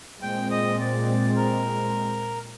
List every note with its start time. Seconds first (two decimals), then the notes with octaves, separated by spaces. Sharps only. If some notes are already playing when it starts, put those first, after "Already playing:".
0.22 A#2 G#3 C4 G5
0.50 D#5
0.79 D5
1.36 A#4